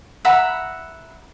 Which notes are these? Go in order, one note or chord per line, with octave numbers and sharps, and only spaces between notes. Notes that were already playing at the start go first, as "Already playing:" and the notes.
E5 F#5 A#5 B5